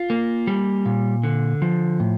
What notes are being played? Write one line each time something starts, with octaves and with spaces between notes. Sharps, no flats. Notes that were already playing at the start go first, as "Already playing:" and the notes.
Already playing: F4
A#3
G3
A#2
D3
F3
A2